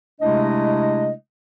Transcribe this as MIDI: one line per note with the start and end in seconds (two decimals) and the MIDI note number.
0.21 1.12 48
0.21 1.12 56
0.21 1.12 57
0.21 1.12 62
0.21 1.12 64
0.21 1.12 75